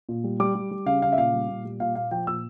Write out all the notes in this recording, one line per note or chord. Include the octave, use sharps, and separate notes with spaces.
A#2
G3
G3 D6
G3
G3
C#3 F5
C#3 F5
E5
A#2 F5
G3
A#2
G3
A#2 F5
A#2 F5
F3 G5
A#2 E6